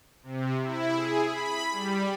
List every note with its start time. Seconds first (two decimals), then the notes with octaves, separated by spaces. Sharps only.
0.23 C3
0.62 E4
0.94 G#4
1.25 B5
1.72 G3